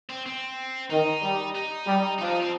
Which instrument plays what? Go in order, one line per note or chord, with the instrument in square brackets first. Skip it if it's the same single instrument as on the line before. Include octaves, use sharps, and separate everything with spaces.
[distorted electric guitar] C4
C4
[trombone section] D#3 [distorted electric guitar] D#4
[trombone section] G3
[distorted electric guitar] D#4
[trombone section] G3
[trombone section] F3 [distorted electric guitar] D#4
[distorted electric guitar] D4
D#4
C4